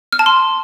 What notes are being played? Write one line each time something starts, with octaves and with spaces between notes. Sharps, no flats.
F6
A5
C6